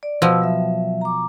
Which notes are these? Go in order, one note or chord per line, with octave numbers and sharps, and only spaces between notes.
D5
B2 F3 E6
F#3 E5
A#5 D6